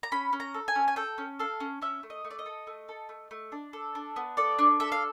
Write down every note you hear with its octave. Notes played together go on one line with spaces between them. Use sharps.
A#5
C#4 B5
C#4
A#5
A4
G#5
C#4
G#5
A4 G5
C#4
A4 F5
C#4
C#4 E5
A3
D#5
A3
D5
D#5
A4
A3
A4
A3
A3
D4
A4
D4
B3
A4 D5
D4
A4 E5
F5